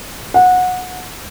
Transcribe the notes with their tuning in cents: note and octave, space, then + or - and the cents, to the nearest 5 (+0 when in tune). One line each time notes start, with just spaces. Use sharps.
F#5 -20